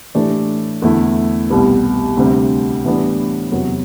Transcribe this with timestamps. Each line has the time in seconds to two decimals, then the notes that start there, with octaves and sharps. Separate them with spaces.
0.15 A2 E3 A3 D4 G4
0.82 E2 D3 A3 E4
1.50 C2 B2 G3 B3
2.17 D2 C3 G3 C4
2.84 A2 E3 G3 B3 D4
3.52 E2 C3 F#3